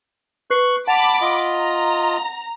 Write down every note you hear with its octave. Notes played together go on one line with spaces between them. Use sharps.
B4 C#6 F#6 C7
F#5 A5 B5 D6 F7
F4 D#5
A#5